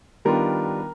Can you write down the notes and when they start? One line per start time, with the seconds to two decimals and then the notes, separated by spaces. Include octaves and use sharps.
0.25 D#3 G3 B3 D4 F4 A#4